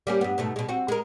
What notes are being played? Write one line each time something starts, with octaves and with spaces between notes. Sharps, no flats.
G3 A#3 C#4
G2 B3
G#2 B2 A3
B2 G#3
C4 F#4
G#3 A#4